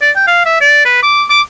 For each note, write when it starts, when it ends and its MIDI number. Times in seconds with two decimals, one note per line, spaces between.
0.01 0.10 74
0.16 0.24 79
0.27 0.45 77
0.46 0.58 76
0.61 0.84 74
0.85 0.98 71
1.03 1.24 86
1.30 1.41 86